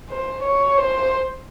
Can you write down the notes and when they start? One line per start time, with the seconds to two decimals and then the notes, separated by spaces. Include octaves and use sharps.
0.10 C5
0.43 C#5
0.78 C5